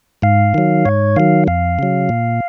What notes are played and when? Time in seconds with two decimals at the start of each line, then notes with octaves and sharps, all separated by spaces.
0.22 G#2 F5
0.54 D#3 F#3
0.85 G#2 C#5
1.16 D#3 F#3 F5
1.47 F2 F5
1.79 C#3 F#3
2.09 A#2